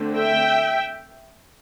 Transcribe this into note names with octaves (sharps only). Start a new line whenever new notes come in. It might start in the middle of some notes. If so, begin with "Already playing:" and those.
Already playing: D3 A3 C4
E5 G5